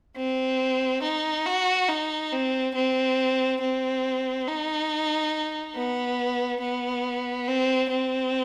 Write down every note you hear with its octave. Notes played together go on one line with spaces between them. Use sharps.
C4
D#4
F#4
D#4
C4
C4
C4
D#4
B3
B3
C4
C4